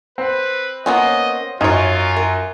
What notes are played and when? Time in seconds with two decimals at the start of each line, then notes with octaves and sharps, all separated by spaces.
0.18 C4 B4
0.86 A#3 B3 C#4 D#5
1.61 F#2 D#4 F4 C#5
2.17 A#4